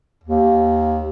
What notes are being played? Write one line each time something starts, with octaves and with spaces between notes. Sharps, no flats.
D#2